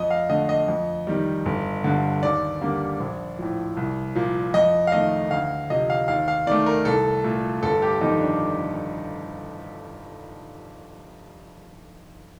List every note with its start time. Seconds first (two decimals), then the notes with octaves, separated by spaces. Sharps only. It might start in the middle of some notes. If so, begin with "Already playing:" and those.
Already playing: F2 D#5
0.11 F5
0.29 D3 A3 D#5
0.49 D#5
0.68 F2
1.07 D#3 G3
1.46 G1
1.84 G2 D3
2.23 D#2 D5
2.61 D3 G3 A#3
3.00 A#1
3.39 A2 F3
3.77 C2
4.15 A#2 F3
4.54 F2 D#5
4.87 F5
4.92 D#3 A3 D#5
5.31 D2 F5
5.70 C3 F3 D#5
5.90 F5
6.08 D#2 F5
6.28 F5
6.47 D#3 A3 D5
6.66 A#4
6.85 C2 A4
7.24 A#2 A3
7.63 G1 A4
7.82 G4
8.01 F2 D#3 D#4
8.21 D4